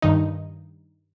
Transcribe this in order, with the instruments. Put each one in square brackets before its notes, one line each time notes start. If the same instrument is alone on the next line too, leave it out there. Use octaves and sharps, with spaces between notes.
[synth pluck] G2 D#3 D#4